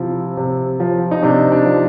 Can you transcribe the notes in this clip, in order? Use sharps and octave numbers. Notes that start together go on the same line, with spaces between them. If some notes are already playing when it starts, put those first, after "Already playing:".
Already playing: C3 F3 E4
C3
F3
D#4
C3 D4
D4
F3